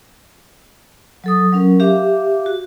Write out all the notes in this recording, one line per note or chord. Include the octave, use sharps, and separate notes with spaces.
F#3 A4 D#6
F#3 C#4 A#4
G4 E5 F5 D6
F#4